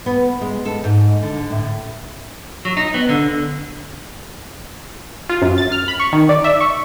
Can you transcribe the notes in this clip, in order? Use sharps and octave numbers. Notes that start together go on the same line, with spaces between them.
B3
G#3
A4
G#2
D3
A2
F#3
D#4
B3
D3
F4
F#2
A6
F6
B5
C#6
D#3
D5
E5
C#6